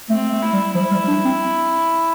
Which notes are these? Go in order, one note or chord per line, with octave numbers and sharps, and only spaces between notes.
A3 C4
A3
E4
G3
F3 E4
G3
D4
C4